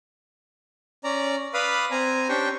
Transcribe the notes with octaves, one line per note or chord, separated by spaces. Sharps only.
C#4 D5 A#5
B4 D5 F5 B5 D#6
C4 G#5 A#5
C#4 D4 G4 C5 G5 C#6